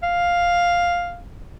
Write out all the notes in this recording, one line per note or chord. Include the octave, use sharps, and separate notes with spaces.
F5